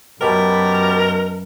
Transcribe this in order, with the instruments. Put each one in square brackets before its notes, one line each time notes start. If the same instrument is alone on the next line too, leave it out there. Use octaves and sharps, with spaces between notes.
[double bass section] F#2 [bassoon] B2 [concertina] G4 A5 B5 [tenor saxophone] A#4